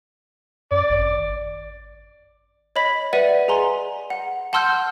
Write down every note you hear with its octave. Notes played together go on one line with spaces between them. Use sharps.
F#2 D5
G#1
C#5 D#5 B5 B6
B4 D5 E5 F#5 D#7
G#4 G#5 A#5 C6
F#5
F#5 A5 C6 E6 F6 G6